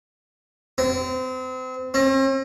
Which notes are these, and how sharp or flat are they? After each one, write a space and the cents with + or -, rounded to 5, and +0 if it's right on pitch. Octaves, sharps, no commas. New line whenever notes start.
C4 -30
C4 +45